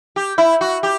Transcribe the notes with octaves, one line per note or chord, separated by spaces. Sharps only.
G4
E4
F#4
G4